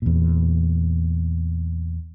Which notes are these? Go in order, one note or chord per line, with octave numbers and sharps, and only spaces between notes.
E2 A#2